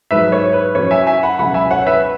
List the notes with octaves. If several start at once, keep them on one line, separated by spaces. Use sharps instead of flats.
G#2 F#3 B4 E5
C#5
B4
F#2 F#3 C#5
E5 G#5
E5 G#5
F#5 B5
C#2 B2 F#3 F#5 B5
E5 G#5
C#5 F#5
B4 E5